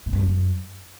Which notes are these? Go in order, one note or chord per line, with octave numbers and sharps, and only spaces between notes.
A2
G2
F#2